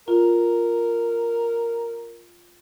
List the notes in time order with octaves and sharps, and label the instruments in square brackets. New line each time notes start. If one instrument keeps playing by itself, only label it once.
[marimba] F4 [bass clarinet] A#4